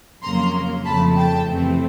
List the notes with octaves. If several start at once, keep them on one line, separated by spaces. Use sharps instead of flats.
F2 C#3 F#3 A#3 A#5 C6
F2 C#3 F3 A3 A5 B5
G5 A5
F2 C3 E3 A3 C4